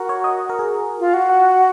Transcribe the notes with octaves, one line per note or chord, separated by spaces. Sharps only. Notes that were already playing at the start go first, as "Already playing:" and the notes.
Already playing: F#4 A#4
C#5
D#5
A#4
G#4
F4
F#4
F#5